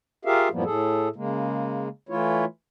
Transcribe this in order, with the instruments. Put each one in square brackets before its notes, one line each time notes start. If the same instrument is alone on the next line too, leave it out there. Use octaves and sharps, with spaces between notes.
[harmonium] F4 G4 G#4 A#4 E5 F5
F#2 A2 F3 G3 A#3 B3
A2 G#4 A4
C#3 G#3 A#3
E3 A3 E4 F4 C#5